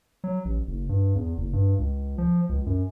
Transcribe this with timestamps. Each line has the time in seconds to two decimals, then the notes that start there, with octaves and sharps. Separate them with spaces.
0.24 F#3
0.45 A1
0.67 F#1
0.89 G2
1.15 E2
1.37 F#1
1.53 G2
1.79 C#2
2.18 F3
2.49 C#2
2.66 F#2